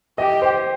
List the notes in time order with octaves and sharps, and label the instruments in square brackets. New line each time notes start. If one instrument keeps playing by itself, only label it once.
[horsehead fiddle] G4 [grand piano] D#5
[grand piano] C5